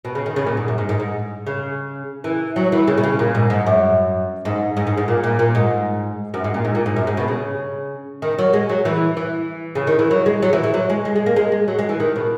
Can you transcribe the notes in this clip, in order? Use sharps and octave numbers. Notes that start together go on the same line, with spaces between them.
B2
C#3
D#3
C#3
A#2
G#2
F#2
G#2
G#2
G#2
C#3
E3
F#3
E3
C#3
B2
C#3
A#2
G#2
G#2
F#2
G#2
G#2
G#2
G#2
A#2
A#2
A#2
G#2
F#2
G#2
A#2
G#2
A#2
G#2
F#2
G#2
B2
C#3
D#3
F#3
G#3
F#3
E3
E3
C#3
D#3
E3
F#3
G#3
F#3
E3
E3
F#3
G#3
G#3
G#3
A#3
G#3
G#3
F#3
G#3
E3
D#3
B2